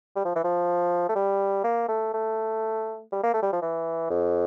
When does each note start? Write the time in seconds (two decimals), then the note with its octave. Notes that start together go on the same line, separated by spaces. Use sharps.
0.16 G3
0.25 F3
0.35 E3
0.44 F3
1.09 A3
1.16 G3
1.64 A#3
1.88 A3
2.14 A3
3.12 G3
3.23 A#3
3.34 A3
3.42 G3
3.53 F3
3.62 E3
4.10 F2